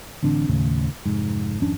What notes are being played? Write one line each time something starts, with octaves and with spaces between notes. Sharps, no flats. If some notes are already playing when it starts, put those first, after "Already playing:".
A1 D3 C4 D4
D#2 A2 C#3
F1 G#2
G#1 F2 C#4 D4